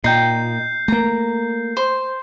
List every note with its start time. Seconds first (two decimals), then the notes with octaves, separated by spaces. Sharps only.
0.04 A#2 D#4 G5 G6 C7
0.88 A3 A#3 A#5
1.77 C5